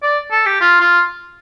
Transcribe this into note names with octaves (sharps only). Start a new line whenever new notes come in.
D5
A4
G4
F4
F4